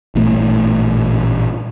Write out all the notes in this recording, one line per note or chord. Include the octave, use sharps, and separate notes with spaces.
A1 G2 A#2 A3